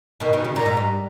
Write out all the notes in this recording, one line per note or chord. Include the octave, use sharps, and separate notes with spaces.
B2 D#3
B2 D#3
C#3
A#2 A#5
G#2
G2